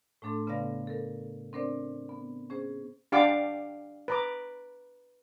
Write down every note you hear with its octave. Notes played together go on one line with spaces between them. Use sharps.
A2 A3 D4 A4 C6
C#3 B3 B4 D5 F5 A#6
A4 A#4
C4 D4 A#4 C5 D5
B3
C#4 G#4 C5
D4 G4 F5 F#5 A5 D6
B4 A#5 D6